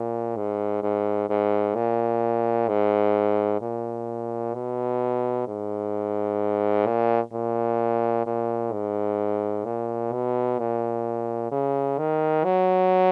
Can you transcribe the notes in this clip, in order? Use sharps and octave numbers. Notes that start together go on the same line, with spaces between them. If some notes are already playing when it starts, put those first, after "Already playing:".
Already playing: A#2
G#2
G#2
G#2
A#2
G#2
A#2
B2
G#2
A#2
A#2
A#2
G#2
A#2
B2
A#2
C#3
D#3
F#3